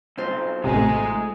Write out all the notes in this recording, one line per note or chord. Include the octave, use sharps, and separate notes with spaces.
B1 C4 F4 C5
A1 C3 G#3 A3 D#4 G#5